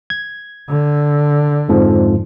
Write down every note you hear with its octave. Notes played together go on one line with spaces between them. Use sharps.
G#6
D3
F2 G#2 F3